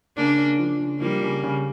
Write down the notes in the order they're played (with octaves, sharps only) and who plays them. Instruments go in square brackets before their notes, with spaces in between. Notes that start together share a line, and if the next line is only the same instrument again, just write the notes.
[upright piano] C#3 [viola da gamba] A#3 D4
[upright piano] C#3
F3
C#3
[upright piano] F3 [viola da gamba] G3 A#3
[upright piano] C#3
C#3